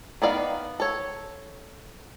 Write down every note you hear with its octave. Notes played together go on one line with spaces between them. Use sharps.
D#3 B3 D5 F5
A4 C#5